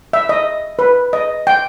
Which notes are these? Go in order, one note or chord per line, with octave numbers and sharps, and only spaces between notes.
E5
D#5
B4
D#5
G5